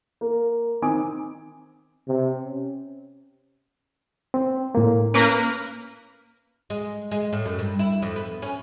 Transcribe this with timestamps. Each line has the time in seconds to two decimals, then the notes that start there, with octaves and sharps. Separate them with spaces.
0.21 A#3
0.82 D#3 C4 G#5 D6 D#6 D7
2.08 C3
2.44 C#4
4.34 C4
4.75 A2 A#3
5.14 A#3 C#4 A#4 B4
6.70 G#3
7.11 G#3
7.33 A2
7.46 F#2
7.59 G2
7.79 E4
8.02 F2
8.16 B3
8.42 C#4